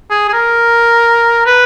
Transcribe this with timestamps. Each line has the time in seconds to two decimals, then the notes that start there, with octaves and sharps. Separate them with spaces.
0.10 G#4
0.29 G#4
0.33 A#4
1.46 B4